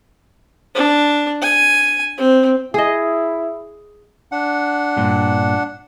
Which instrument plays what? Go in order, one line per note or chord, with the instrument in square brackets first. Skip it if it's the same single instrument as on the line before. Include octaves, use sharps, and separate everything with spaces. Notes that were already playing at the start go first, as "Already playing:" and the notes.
[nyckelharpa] D4
G#5
C4
[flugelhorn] E4 [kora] G#4 D#5
[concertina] D4 F#5
[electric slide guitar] G2 A#2